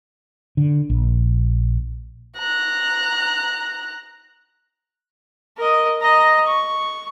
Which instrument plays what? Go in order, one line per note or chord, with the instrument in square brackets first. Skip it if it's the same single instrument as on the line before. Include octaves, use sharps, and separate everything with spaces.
[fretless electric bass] D3
A#1
[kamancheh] A#5 F#6
[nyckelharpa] A#4 D#5
D#5 A#5
C#6